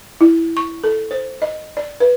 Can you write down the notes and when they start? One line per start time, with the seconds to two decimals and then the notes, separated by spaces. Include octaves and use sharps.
0.21 E4
0.57 C#6
0.84 A4
1.11 C5
1.42 D#5
1.77 D5
2.00 B4